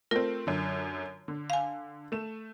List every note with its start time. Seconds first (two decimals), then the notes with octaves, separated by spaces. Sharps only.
0.11 A3 C4 F4 A#4
0.47 F#2 D3
1.28 D3
1.50 F5 G#5
2.12 A3 E7